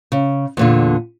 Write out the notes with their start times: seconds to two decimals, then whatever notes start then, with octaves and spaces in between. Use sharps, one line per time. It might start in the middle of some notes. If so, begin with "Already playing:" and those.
0.12 C#3
0.57 E2 A#2 D3